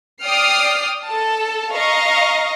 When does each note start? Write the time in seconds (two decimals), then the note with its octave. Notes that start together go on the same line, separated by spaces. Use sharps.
0.24 D5 G5 D#6 F6 C7
1.06 A4 A5
1.72 D#5 F5 A#5 C#6 A#6